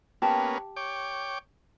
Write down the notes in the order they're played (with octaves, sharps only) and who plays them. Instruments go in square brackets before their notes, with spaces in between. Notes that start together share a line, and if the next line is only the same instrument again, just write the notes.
[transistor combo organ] A#3 B3 C#4 [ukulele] G4 A5
[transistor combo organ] C#5 G5 D6